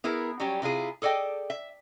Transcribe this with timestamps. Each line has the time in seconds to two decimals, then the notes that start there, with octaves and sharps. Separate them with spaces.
0.04 B3 E4 G#4 A#4
0.40 F#3 G3 C#4 G4
0.62 C3 E4 F4 G#4
1.02 G#4 A4 D5 D#5 G5
1.50 E5